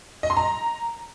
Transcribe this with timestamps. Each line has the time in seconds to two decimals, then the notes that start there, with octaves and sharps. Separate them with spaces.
0.23 D#5
0.30 C6
0.37 A#5